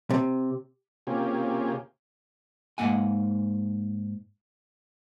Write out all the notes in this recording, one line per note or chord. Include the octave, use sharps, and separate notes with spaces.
C3
C3 A#3 C#4 F4 G4 G#4
G#2 F3 A#3 F#5 G#5